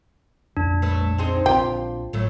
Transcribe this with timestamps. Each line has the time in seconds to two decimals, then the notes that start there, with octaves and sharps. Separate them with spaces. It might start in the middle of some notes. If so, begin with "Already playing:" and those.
0.57 A#1 F2 D4
0.82 A3 B4
1.18 C4 D#4 G#4
1.46 A#1 C4 F4 G4
2.13 G#1 A2 F#3 A3